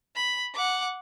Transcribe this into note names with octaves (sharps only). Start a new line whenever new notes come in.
B5
F#5 D6